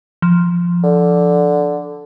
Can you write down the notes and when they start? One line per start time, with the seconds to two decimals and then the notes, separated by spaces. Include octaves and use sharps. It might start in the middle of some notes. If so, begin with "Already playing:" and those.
0.22 F3
0.83 D3